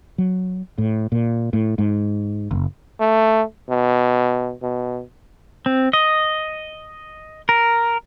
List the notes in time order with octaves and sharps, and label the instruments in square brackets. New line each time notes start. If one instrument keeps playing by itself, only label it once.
[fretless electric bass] F#3
A2
A#2
A2
G#2
F#1
[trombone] A3
B2
B2
[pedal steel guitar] C4
D#5
A#4